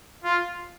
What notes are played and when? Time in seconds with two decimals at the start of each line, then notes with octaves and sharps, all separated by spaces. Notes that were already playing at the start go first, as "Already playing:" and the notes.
0.24 F4